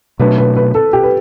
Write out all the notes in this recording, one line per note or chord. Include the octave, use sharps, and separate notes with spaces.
B2 F#3 A3 D4 B4
B4
B4
A4
G4
B4